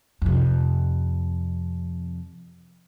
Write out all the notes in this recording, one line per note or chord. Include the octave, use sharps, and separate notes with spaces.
F2 C3